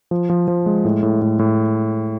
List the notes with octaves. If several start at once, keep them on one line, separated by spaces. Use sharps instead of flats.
F3
F3
F3
G#3
A2
A2
A2
A2